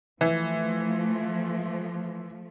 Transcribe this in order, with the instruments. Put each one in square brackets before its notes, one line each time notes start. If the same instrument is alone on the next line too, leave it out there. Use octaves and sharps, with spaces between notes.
[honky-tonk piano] E3 [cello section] F3 A3